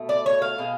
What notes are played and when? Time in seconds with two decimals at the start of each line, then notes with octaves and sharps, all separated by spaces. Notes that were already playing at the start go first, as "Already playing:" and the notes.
Already playing: B2 A3
0.09 D5
0.26 C#5
0.42 F5
0.58 B2 G#3